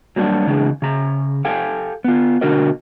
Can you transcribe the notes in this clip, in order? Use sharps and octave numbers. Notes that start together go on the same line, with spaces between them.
F#3 G3 A#3 D4 F#4
C#3 E3 G#3 D4
C#3 A#5
G4 A4 F5 G5 G#5
B3 F4
B2 D3 D4 F#4 A#4 D#5